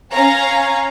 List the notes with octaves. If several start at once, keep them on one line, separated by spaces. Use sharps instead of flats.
C#4 C#5 F5 G#5 A#5